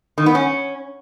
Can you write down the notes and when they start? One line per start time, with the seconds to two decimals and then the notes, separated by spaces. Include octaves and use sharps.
0.18 D#3
0.26 B3
0.35 C#4